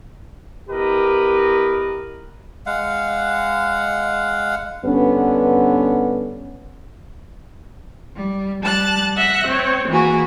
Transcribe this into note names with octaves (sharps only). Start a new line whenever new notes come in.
B3 E4 G4 A#4 B4 D#5
G#3 F5 F#5
G2 D3 B3 C#4
G3
G3 A5 F#6 A6
E5 F#5 F#6 A#6
C4 C#5
E3 A#3 F#4 G#4